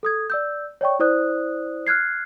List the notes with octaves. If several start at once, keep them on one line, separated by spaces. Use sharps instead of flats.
A4 D#6 G#6
D5 E6 G6
C#5 D5 G5 C#6
E4 C5 D5 D#6 F#6
F6 F#6 G#6 C7